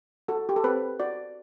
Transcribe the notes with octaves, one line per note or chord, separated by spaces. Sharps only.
F#4 A4
G4
A4
C4 B4
F#4 D5